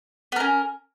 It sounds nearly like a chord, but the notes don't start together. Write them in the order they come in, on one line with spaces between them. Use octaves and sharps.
B3 A#4 C#4